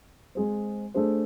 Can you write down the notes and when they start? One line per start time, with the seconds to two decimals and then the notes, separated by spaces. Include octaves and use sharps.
0.35 G#3 C4 G#4 C5
0.94 A3 D4 G#4 C5